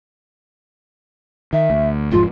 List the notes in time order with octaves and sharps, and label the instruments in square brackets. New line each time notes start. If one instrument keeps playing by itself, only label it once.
[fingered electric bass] D#3 [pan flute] E5
[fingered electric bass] D2
[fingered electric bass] E1 G#2 F3 [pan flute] F4